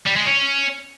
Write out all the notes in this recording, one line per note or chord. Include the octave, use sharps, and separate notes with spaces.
G3
G#3
C#4